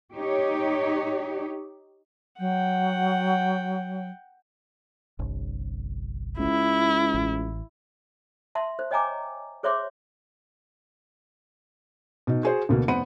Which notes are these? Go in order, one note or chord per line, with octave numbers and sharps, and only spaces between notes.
D#4 G4 C#5
F#3 F#5 G5
G1 C2
C#2 E4
A1
E5 A5 C6
C5
C#5 D#5 G5 G#5 A#5 D6
G#4 C5 C#5 E5 C6 D6
B2 D#4
F#4 G#4 C5
D2 B2 A#3
F1 B3 C5 F#5 B5 D#7